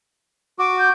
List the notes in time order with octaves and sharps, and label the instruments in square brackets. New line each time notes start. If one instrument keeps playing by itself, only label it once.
[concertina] F#4 [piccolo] D6
[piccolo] G6